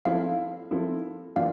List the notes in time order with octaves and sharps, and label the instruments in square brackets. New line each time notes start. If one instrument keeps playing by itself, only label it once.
[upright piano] F3 C4 E4 A4 [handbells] F5
[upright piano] F3 C4 E4 A4
[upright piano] E3 A#3 D4 F4 [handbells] F5